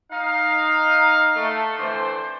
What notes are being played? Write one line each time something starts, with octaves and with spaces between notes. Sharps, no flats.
D#4 F5
A3
D3 E3 A3 C4 C5